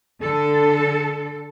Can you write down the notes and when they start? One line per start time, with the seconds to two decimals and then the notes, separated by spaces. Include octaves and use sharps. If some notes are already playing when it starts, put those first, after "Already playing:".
0.21 D3 A4